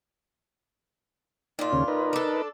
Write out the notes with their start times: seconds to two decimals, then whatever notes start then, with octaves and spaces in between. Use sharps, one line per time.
1.59 A#2 D#4 F4
1.73 D#2 C#3 C#4
1.88 D#4 A#4 B4
2.13 D4 A4